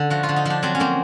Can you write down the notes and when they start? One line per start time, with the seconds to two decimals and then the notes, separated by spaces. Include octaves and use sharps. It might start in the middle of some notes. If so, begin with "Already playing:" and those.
Already playing: D3
0.10 F3 F#4
0.23 F4
0.29 D3
0.36 D#4
0.45 F3 D4
0.63 F#3 C4
0.75 C#4
0.80 A#3 C4